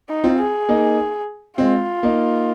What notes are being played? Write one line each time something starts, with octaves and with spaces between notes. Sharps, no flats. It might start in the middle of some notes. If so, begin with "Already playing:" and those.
D#4
C4 F4
G#4
A#3 D#4
G#3 C4 F4
A#3 D#4